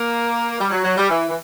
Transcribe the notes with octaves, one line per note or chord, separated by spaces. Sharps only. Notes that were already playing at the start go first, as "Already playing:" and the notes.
Already playing: A#3
G3
F#3
F#3
G3
E3
E3